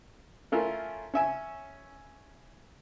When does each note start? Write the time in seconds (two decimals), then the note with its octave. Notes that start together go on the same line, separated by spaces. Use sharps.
0.52 A3 C#4 E4 F4 A#4 E5
1.14 C#4 E5 G#5